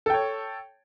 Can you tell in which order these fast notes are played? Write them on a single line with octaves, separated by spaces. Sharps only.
A4 G5 C#5